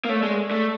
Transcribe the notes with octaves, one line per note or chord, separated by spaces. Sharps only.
A#3
A3 C#5
G#3 D5
C#5
A3 D5